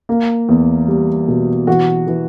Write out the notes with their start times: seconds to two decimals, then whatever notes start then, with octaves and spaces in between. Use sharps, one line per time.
0.09 A#3
0.49 E2
0.88 G3
1.28 B2
1.67 E3 F#4
2.07 E3